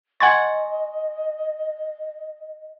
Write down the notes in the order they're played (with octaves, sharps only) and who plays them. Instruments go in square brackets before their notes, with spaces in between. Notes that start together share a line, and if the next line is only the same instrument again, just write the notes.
[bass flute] D#5 [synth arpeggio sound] F#5 G#6 A6 [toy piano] G#5 C6 C#6